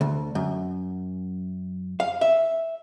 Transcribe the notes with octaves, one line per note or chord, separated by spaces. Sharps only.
D2
F#2
F5
E5